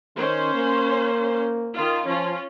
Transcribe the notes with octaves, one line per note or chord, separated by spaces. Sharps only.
D#3 C#4 C5
A#3
D#3 F4
F3 C#4 F4